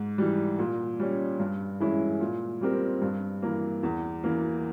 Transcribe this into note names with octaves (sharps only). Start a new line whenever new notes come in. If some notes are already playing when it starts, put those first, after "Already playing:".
Already playing: G#2
E3 G3
A#2
G3 C#4
G2
E3 G#3 C#4 E4
A#2
G3 C4 G4 A#4
G2
E3 A#3
E2
E3 A#3